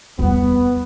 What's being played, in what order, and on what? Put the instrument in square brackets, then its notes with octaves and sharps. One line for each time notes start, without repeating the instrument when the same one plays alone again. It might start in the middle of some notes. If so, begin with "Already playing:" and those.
[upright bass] E2 G3 [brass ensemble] B3